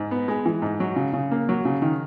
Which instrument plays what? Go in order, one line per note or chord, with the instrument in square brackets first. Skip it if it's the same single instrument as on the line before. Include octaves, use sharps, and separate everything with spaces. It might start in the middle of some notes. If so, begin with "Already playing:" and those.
Already playing: [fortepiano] G#2
B3
G#3
E3
G#2
F#3
C#3
C#3
A#3
F#3
C#3
D#3